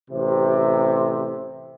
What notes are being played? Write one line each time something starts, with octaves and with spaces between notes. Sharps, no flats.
A1 C3